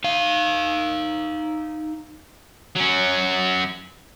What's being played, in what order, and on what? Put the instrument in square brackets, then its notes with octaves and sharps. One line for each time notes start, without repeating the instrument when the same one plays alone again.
[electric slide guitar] D#4 F5
[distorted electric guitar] F#3 C#4